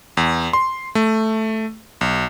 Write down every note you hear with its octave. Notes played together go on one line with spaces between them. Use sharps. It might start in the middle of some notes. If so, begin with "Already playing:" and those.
E2
C6
A3
B1